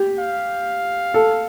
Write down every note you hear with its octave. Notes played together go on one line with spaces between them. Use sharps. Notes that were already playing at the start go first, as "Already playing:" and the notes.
Already playing: G4
F5
A4